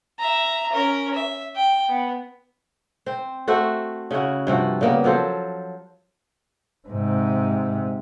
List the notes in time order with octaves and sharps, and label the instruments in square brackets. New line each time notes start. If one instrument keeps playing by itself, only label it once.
[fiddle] E5 A#5
C#4 A#4
E5
G5
B3
[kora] C4 C5
A3 F#4 C5 E5
C#3 C#4 E4 F#4
G2 C3 F3 F#4
C#3 G3 A#3 B3
F3 F#3 A4 C5
[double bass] G#2 C3